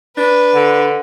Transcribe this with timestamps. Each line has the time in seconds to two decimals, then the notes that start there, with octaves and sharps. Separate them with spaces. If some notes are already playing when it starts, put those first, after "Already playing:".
0.17 D4 B4
0.54 D3